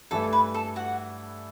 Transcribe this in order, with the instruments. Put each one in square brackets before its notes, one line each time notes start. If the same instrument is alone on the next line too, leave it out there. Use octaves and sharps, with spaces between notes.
[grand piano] G2 E3 A3 E4 [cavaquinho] A4
[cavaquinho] B4
A4
F#4 F#5